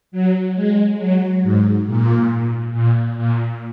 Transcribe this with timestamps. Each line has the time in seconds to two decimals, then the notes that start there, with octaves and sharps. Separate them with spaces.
0.12 F#3
0.55 G#3
0.98 F#3
1.43 G#2
1.86 A#2
2.74 A#2
3.17 A#2